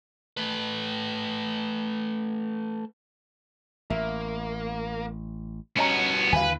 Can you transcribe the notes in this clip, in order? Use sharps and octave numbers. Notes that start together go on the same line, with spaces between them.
A3 B4
A1 A#3 E5
G2 B3 C#4 F#4 C#5 D#5 A#5
D#2 D3 E3 B4 F5 G#5